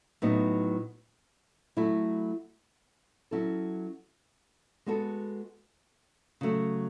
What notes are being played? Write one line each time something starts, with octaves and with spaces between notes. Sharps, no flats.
A2 F#3 B3 D#4
F#3 A3 E4
F#3 C#4 E4 A4
G#3 B3 F#4 A4
C#3 F#3 A3